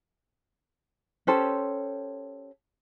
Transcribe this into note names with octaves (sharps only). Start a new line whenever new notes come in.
C#4 G4 A4 C5